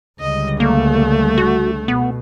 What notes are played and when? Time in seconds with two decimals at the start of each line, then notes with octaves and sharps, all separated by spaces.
0.20 C#2 D3 G3 D#5
0.60 A3 A#3
1.38 F#4
1.88 B2 B3